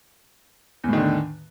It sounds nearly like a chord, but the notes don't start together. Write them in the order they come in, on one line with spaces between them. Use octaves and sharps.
E2 A2 D#3 D3